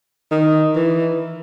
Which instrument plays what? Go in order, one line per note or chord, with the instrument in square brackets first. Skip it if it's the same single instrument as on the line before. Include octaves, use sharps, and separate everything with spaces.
[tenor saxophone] D#3
E3